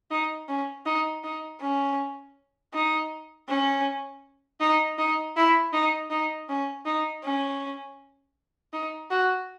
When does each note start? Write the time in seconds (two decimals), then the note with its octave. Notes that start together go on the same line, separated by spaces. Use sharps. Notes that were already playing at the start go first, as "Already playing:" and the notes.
0.11 D#4
0.49 C#4
0.86 D#4
1.24 D#4
1.60 C#4
2.74 D#4
3.49 C#4
4.60 D#4
4.98 D#4
5.36 E4
5.73 D#4
6.10 D#4
6.49 C#4
6.85 D#4
7.23 C#4
8.73 D#4
9.10 F#4